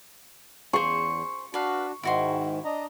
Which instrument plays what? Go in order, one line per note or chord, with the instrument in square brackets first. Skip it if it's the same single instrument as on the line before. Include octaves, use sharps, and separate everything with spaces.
[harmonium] E2 [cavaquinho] G#4 C5 [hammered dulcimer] C#6
[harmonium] D4 F#4 [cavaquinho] B4 F5
[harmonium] G#2 D#3 [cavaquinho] E4 F#4 C6
[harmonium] D4 D#5 A#5